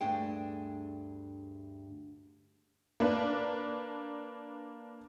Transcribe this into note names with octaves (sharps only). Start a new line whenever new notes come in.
D2 G2 A3 D4 G#4 G5
A#3 D4 B4